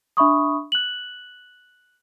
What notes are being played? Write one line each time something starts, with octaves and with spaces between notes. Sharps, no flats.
D4 E5 B5 C#6 D#6
F#6 F#7